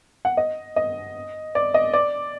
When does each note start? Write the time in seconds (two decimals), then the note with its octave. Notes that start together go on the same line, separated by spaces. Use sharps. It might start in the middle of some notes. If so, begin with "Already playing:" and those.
0.25 F#5
0.37 D#5
0.76 D#5
1.55 D5
1.74 D#5
1.94 D5